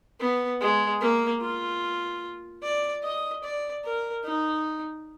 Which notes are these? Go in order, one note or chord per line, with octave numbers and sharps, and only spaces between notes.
B3
G#3
A#3
F4
D5
D#5
D5
A#4
D#4